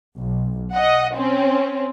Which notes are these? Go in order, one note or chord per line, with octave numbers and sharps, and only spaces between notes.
B1
D#5 F#5
C4 C#4